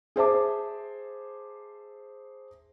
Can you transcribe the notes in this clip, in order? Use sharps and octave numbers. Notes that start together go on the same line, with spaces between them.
G#4 C5 E5 A5 D6